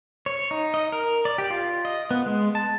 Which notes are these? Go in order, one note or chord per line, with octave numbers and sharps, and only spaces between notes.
C#5
D#4
D#5
A#4
D5
G4
F4
D#5
B3
G#3
A5